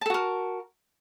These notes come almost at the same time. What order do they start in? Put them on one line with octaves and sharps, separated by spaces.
A5 A4 F#4 A#4